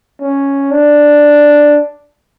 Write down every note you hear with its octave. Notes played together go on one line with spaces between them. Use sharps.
C#4
D4